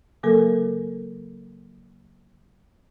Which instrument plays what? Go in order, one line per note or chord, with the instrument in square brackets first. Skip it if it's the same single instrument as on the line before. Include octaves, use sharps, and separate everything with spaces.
[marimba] C#3 F#3 A#3 A4 A#4